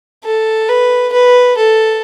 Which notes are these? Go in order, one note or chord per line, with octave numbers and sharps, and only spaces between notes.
A4
B4
B4
A4